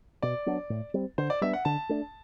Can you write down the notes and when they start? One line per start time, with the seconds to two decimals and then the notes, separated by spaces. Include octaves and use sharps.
0.22 B2 D5
0.46 F#3 B3 D4
0.70 A2
0.94 G3 C4
1.18 D3 C5
1.30 D5
1.41 G3 B3 D4 E5
1.53 F#5
1.65 D3 A5
1.89 A3 D4